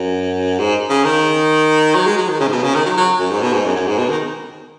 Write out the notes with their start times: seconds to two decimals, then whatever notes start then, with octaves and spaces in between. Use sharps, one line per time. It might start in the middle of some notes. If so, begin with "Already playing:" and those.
Already playing: F#2
0.59 G#2
0.89 C#3
1.04 D#3
1.95 F#3
2.07 G#3
2.18 F#3
2.29 D#3
2.40 C#3
2.48 G#2
2.52 B2
2.63 C#3
2.74 D#3
2.85 F#3
2.97 F#3
3.20 F#2
3.31 G#2
3.42 B2
3.53 G#2
3.65 F#2
3.76 F#2
3.87 G#2
3.98 B2
4.10 D#3